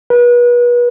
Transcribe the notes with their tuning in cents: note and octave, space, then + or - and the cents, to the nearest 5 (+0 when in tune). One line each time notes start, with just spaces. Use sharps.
B4 -35